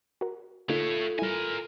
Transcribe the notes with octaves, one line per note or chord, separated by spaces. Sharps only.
F#4 A#4
D3 A3 A#3 D#4 F4 A4 C#5
G3 E4 A#4 G#5